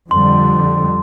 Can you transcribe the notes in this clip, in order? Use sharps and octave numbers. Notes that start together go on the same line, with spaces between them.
F2 D3 G3 C6